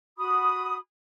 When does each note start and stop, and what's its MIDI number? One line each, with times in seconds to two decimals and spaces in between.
0.17 0.75 66
0.17 0.75 83
0.17 0.75 87